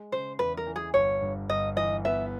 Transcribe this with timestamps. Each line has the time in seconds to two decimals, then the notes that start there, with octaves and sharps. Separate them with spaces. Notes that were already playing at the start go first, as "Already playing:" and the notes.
Already playing: G#3
0.12 C#3 C5
0.39 E2 B4
0.57 A#4
0.67 E3
0.76 G#4
0.94 G1 C#5
1.22 G2
1.49 G1 D#5
1.76 E3 D#5
2.05 B3 E5